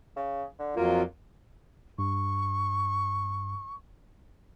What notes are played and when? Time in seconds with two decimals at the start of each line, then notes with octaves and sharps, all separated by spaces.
0.16 C#3
0.59 D3
0.76 F2 F#3 A#3 F4
1.99 G2 C#6